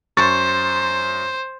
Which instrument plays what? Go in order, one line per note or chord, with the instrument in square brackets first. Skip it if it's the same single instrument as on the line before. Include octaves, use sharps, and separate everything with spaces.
[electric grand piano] F#2 C#6 A6 [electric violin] C5